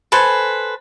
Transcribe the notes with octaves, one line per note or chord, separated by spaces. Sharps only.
A4 B4 C5 G#5